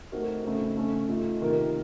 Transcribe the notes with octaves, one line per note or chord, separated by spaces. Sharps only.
A3 C4 D#4 F#4 A#4
C#3 A3 C4 D#4
C#3 A3 C#4
A#2 A3 D#4
C3 D#3 A#3 F4 A#4